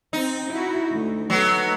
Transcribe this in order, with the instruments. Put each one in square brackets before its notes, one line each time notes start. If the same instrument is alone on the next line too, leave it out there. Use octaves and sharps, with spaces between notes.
[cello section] C4 [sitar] D#4
[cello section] E4 F#4
D2
[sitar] F#3 B3 [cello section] A3 D#4